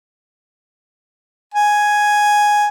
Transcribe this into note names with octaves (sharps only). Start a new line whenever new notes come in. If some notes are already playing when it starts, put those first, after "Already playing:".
G#5